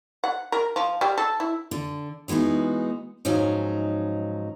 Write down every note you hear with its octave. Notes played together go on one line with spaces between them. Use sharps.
F#5
A#4
F3
G3
A4
E4
D3
E3 G#3 B3 D#4 F#4
G#2 F3 F#3 C#4 D#4